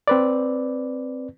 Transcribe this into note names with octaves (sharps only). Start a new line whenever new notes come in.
C4 B4 D5